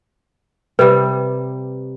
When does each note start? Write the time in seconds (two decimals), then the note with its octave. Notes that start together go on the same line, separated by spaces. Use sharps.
0.79 C3 G3 B4